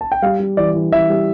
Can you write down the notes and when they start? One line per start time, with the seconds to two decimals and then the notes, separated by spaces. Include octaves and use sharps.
0.01 A5
0.12 G5
0.22 G3 F5
0.40 G3
0.57 E3 D5
0.74 E3
0.91 E3 E5
1.10 G3